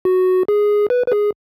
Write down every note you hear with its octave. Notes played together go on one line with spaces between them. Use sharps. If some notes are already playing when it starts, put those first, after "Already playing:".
F#4
G#4
B4
B4
G#4